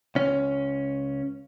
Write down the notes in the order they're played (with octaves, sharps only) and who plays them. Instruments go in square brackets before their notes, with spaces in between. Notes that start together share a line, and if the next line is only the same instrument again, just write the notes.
[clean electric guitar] C#2 C#4